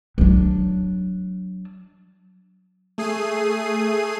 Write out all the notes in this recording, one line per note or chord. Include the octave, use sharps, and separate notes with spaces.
F#3 D4
A3 G#4 C7 D#7